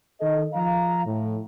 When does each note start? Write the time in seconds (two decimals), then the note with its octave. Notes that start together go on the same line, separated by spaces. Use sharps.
0.20 D#3 A4 D#5
0.54 F3 F5 A#5
1.05 A2